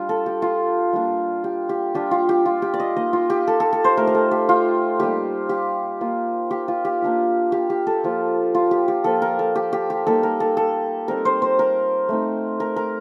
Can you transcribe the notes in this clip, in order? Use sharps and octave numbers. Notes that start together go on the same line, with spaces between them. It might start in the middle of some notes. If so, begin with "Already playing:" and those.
Already playing: G3 D4 F4
A4
G4
F4
G3 A#3 D4 F4
G4
G4
G3 D4 F4 G4
F4
G4
F4
G4
D5
D#5
A#3 D#4 D#5
F4
G4
A4
A4
A4
C5
A3 D#4 A#4
A#4
A4
G4
F4
G3 A#3 D#4 G4
G4
A#3 F4
G4
F4
G4
A#3 D4 F4
G4
G4
A4
F3 A#3 F4
F4
G4
G4
F3 A#3 F4 A4
A#4
A4
G4
G4
G4
G3 A#3 D#4 A4
A#4
A4
A4
G3 C4 D#4 A#4
C5
C5
A#4
A3 C4 D#4
A#4
A#4